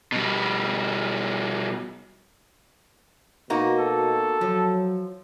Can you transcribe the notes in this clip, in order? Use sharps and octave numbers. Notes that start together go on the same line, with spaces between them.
B2 G3
B2 A#3 D#4 F#4
A4
F3 F#3